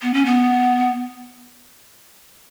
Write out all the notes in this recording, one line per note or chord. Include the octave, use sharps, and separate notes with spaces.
B3
C#4
B3